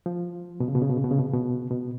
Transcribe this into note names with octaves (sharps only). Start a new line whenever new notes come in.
F3
B2
C#3
B2
C#3
B2
C#3
B2
C#3
B2
C#3
B2
B2